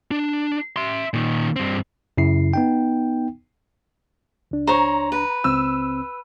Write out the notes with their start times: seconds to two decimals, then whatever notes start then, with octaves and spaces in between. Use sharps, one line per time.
0.11 D4
0.76 E5 C6
1.14 A#2 D#3
1.56 G2 C4
2.18 F#2 C#3 E4 C7
2.53 B3 D#4 G5
4.51 C#2 D4
4.67 C5 C#5 A#5
5.12 B4
5.44 C#2 C4 E6